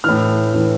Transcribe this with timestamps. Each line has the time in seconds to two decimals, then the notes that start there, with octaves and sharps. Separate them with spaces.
0.04 A2 E3 F6
0.54 A2 E3